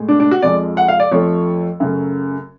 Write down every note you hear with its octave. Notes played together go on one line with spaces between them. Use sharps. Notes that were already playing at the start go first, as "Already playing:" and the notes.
Already playing: A2 G#3
D4
D4
F#4
F2 F3 G#3 D5
F#5
F5
D5
F2 F3 A3 C#5
F#2 C#3 F#3 A3